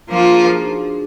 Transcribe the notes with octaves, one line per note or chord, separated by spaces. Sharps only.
F3 A#3 D4 F4
G#4
G#4
F#4
D#4
D4